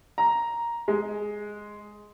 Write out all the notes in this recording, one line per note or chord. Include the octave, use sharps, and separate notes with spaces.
A#5
G#3